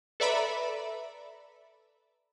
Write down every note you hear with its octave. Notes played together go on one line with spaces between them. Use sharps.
A4 B4 D5 E5 A#5 B5